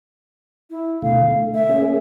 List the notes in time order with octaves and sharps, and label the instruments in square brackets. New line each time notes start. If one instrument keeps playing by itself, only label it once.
[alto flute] E4
[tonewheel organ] B2 D3 A3 [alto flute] F5
[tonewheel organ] A3
[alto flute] E5
[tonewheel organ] A#3 C#4 G#4